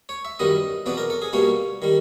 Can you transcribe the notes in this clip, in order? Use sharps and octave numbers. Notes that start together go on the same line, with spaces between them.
C#5
E5
F#2 D#3 G3 B3 D#5
E2 B2 F#3 B3 D5
A#4
A4
G#4
B2 G3 A#3 C#5
D#3 G3